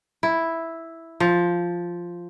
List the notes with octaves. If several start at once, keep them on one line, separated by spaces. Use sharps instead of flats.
E4
F3